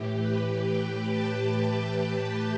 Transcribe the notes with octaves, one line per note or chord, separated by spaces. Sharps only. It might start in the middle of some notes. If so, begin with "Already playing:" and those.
Already playing: A2 E3 G4
B4
G5
A5